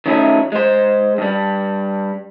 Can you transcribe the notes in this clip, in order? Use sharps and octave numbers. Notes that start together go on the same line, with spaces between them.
D#3 F#3 A3 C#4 D#4 E4
G#3 C5
G2 G3